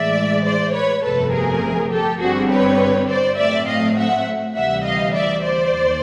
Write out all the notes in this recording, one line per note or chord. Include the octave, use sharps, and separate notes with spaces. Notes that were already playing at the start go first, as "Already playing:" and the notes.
Already playing: A2 E3 G#3 D5 E5
C5 D5
B4 C#5
G1 F2 C3 F3 A3 A4 B4
G#4 A#4
G4 A4
G1 G2 D3 G3 C4 F#4 G#4
B4 C#5
C5 D5
A2 F#3 A3 C4 D5 E5
D#5 F5
E5 F#5
D2 C3 E3 G3 E5 F#5
D#5 F5
D5 E5
C5 D5
D#2